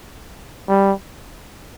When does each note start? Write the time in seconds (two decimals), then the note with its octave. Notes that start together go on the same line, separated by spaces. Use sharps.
0.68 G3